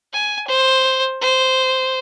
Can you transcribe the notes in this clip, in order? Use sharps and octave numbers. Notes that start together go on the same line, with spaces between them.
G#5
C5
C5